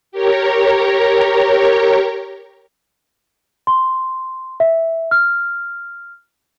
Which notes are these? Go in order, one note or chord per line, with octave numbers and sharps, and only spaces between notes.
G4 A#4 C#5 A#5
C6
E5
F6